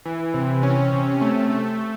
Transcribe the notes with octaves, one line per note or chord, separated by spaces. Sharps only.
E3
C3
C#4
C3
A3
A3